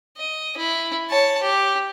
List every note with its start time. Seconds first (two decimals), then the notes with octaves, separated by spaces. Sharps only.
0.17 D#5
0.57 E4
1.10 C#5 A5
1.42 G4